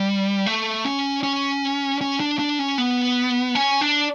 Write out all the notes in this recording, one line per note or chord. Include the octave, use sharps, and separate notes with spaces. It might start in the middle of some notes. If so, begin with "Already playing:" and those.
Already playing: G3
A3
C#4
C#4
C#4
D4
D4
C#4
B3
C#4
D4